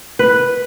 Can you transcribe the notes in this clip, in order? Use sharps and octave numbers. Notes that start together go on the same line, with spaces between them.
B4